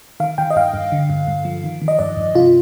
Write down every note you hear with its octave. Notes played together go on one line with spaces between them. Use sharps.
D#3 F5
D#3 G5
D#5
G2 F5
G2
D3
G2
G2
F3
D#3
D#3
D#5
G2 D5
G2
C3 F4